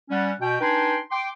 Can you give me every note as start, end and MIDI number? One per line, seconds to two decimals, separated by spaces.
0.10 0.31 55
0.10 0.31 61
0.10 0.31 78
0.41 0.56 47
0.41 0.56 79
0.60 0.97 62
0.60 0.97 63
0.60 0.97 71
0.60 0.97 79
0.60 0.97 80
0.60 0.97 84
1.11 1.29 79
1.11 1.29 84
1.11 1.29 86